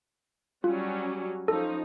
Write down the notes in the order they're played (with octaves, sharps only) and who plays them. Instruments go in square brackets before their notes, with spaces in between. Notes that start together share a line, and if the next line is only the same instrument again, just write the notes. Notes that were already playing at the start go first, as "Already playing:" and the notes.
[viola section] F#3 G3 C#4 [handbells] F4
[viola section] F3 C#4 D#4 [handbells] A4